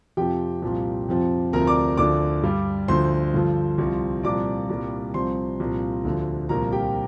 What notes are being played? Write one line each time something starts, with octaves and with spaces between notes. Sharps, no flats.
F2 C3 F3 G4 G5
C2 A#2 F3
F2 C3 F3
D2 C3 F3 A#4 A#5
D5 D6
D2 D3 F3 D5 D6
G2 G3
D2 D3 F3 C5 C6
G2 D3 F3
C2 C3 F3
C2 A#2 F3 D5 D6
C2 A#2 G3
C2 C3 F3 C5 C6
C2 A#2 F3
D2 D3 F3
C2 A#2 F3 A#4 A#5
G4 G5